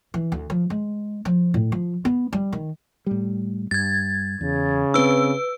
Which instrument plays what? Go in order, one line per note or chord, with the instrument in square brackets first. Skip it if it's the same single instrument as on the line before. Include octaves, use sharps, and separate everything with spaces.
[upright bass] E3
D2
F3
G#3
F3
A2
F3
B3
G3
D#3
[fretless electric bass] A2 G3
[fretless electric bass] G2 [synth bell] G#6 A6
[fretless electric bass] E2 [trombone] C#3
[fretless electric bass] C4 D4 [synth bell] B4 E6